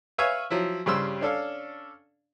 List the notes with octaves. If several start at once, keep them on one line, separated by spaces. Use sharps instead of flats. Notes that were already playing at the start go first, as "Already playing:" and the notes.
B4 C#5 E5 F5 G#5 C#6
F3 F#3 E4
G2 C#3 G3 C5 E6
C#4 D4 A4 F5